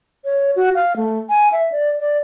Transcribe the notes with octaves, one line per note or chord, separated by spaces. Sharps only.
C#5
F#4
F5
A3
G#5
E5
D5
D5